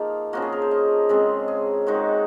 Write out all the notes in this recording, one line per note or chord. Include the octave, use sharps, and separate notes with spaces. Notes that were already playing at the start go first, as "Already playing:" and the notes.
Already playing: F3 A#3 D#4 F4 G#4
C#3 F3 A#3 F#4
G#4
A#4
C5
D#5
C#3 G#3 C4
G#4
D#3 G#3 D#4 F#4